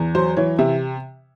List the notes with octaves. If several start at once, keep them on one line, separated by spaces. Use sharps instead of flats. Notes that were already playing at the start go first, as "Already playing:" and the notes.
Already playing: E2
F#3 C5
E3 C#5
C3 E5